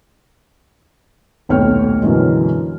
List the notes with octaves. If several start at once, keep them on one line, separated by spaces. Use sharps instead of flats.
D#1 B1 A3 C#5 G5 F6
F#2 B2 D3 E3 G#3